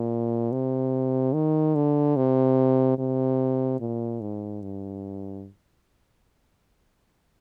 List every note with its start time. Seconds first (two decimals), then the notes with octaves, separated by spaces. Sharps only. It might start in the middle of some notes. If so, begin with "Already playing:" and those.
Already playing: A#2
0.52 C3
1.34 D#3
1.75 D3
2.17 C3
2.98 C3
3.80 A#2
4.21 G#2
4.62 G2